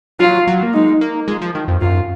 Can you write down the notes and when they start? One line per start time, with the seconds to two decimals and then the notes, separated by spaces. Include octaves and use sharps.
0.20 F#3 F4
0.47 F#3
0.63 A#3
0.74 G#3 D#4
1.01 A#3
1.28 G#3 F4
1.42 F3
1.55 D#3
1.68 F2
1.81 F#2 F4